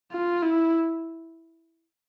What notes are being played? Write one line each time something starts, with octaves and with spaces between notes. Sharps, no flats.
F4
E4